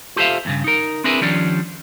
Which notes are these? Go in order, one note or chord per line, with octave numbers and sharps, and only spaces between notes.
F4 G4 A4 C5 E5 F5
E2 G2 C#3
D#4 A#4
C4 D4 E4 G#4 A#4 B4
D#3 F3 G3 C#4 D4